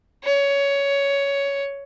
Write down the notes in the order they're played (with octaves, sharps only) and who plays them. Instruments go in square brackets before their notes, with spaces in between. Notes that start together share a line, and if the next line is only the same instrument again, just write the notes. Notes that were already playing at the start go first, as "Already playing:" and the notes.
[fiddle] C#5